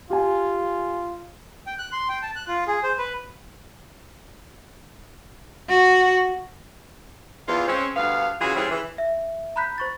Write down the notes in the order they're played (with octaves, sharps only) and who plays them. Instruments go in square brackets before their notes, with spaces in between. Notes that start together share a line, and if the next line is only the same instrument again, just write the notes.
[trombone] F4 [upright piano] G4 G#5
[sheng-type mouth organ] G5
F#6
C6
G5
A5
F#6
F4
G#4
C5
B4
[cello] F#4
[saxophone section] E2 F4
G#3 C4 C#4
D2 G2 B3 F5
C#3 E3 F4 F#4 G#4
E3 G3 C4 C#4 E4 G#4
E3
[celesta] E5
A#5 B5 F#6 G6 B6
C5 C#6 A6